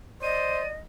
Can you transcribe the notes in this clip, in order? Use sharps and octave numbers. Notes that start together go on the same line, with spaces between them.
C5 D5 D#5 D#7